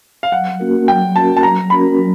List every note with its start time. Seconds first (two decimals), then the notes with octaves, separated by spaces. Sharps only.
0.23 F5
0.32 F#3 F#5
0.60 A#3 C#4 F#4 A#4
0.88 F#3 G5
1.15 A#3 C#4 F#4 A#4 A5
1.37 A5
1.43 F#3 A#5
1.70 A#3 C#4 F#4 A#4 B5
1.98 F#3